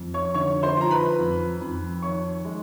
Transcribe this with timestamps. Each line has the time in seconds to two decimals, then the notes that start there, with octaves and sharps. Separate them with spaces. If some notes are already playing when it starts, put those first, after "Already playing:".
Already playing: F2
0.14 C#5 C#6
0.34 D3 C#5 C#6
0.63 C5 C6
0.77 F3 A#5
0.91 B4 B5
1.20 F2
1.61 F2
2.02 D#3 C#5 C#6
2.45 G#3